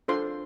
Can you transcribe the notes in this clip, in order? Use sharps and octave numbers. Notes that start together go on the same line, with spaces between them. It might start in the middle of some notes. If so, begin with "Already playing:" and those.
D4 F4 A4 C5 C6